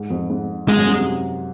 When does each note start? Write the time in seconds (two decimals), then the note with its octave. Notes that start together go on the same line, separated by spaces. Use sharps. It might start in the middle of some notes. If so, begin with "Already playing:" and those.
Already playing: G#2
0.10 F2
0.30 G#2
0.68 G#2 G#3
0.77 F#2
0.87 G#2
0.97 C3